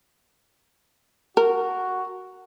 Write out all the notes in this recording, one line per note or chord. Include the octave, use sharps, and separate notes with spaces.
F#4 A#4